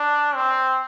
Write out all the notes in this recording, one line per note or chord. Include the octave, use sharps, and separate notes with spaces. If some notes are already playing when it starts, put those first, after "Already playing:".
Already playing: D4
C4